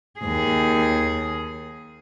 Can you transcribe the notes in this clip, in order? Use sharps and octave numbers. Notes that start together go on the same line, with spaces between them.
D#2 G#4